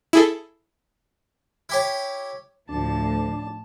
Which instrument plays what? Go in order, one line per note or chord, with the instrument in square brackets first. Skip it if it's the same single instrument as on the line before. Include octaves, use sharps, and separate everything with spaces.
[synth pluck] E4 G#4 A4
[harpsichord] E4 G4 C#5
[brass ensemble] D2 [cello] A2 F3 [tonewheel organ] D4 [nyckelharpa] A5